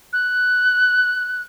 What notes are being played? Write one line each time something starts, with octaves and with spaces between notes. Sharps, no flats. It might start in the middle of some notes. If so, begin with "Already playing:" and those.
F#6